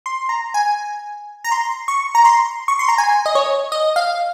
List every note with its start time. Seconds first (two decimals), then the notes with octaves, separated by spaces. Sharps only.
0.06 C6
0.29 A#5
0.54 G#5
1.44 A#5
1.52 C6
1.88 C#6
2.15 A#5
2.25 C6
2.68 C#6
2.79 C6
2.88 A#5
2.98 G#5
3.26 D#5
3.35 C#5
3.72 D#5
3.96 F5